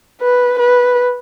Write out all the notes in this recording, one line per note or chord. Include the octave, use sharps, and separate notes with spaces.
B4
B4